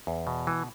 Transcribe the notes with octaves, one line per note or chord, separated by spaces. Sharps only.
E2
B2
E3